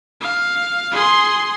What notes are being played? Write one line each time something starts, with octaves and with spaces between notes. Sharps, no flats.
F5
G#4 C6